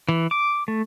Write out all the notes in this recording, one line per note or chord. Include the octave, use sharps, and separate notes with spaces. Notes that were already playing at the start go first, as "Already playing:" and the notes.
E3
D6
A3